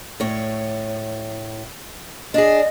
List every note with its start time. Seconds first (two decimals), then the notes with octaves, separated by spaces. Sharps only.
0.20 A2 C#5
2.34 D4 G#4 D#5